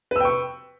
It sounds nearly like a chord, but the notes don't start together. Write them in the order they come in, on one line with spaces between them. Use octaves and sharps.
B4 E6 G5 C#6